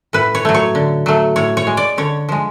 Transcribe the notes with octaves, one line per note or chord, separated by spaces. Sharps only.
A2 B4
C#5
F#3 A3
C#5
D3
F#3 A3
A2 C#5
C#5
G#3
D5
D3 C#5
F3 G#3